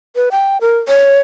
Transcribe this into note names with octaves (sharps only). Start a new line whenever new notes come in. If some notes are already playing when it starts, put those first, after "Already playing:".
B4
G5
A#4
C#5